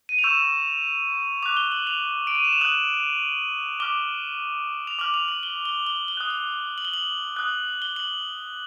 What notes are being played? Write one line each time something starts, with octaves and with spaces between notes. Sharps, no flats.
D#7
F7
C#6 E6 G6 E7
D6 F#6 F7
G7
F#7
F7
D7
D#7
E7
F7
D#6 F#6 F#7
D6 F6 G7
F7
D6 F6 F#7
F7
F#7
G7
G7
G7
G7
D#6 F#6
G7
F#7
G7
F#7
D#6 F#6
G7
F#7